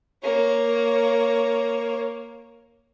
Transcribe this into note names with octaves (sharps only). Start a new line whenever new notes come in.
A#3 C#5